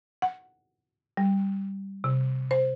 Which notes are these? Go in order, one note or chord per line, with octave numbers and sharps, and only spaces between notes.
F#5
G3
C3
C5